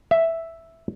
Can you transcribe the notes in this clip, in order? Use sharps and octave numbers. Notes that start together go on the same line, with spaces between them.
E5